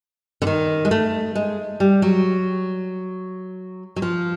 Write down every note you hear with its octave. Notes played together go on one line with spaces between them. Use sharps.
D3
D#3
G#3
A3
G#3
G3
F#3
F#3
F3